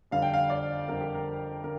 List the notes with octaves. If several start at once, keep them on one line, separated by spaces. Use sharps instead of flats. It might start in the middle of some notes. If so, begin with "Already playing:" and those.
F2 D3 G3 F5
G5
F5
D5
F2 D3 G3 A#4
G4
A#4
D3 A#4